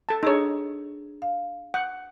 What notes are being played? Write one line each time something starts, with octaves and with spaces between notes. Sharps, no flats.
A4 A5
D4 D#4 G#4 C#5 E6
F5
F#5 G6